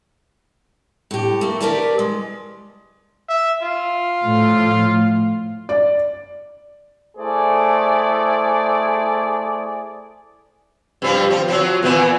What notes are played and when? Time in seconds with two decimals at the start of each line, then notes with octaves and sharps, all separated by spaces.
1.11 A2 G4
1.41 A3 A#3
1.61 G4 G#4 A#4 B4 D5 A5
1.99 G#3
3.29 E5
3.62 F4
4.23 A2 F3
5.69 D5
7.18 A3 E4 G#4 C5 D5
11.02 G2 F3 G3
11.30 F3
11.48 F3 F#3
11.83 A#2 E3 B3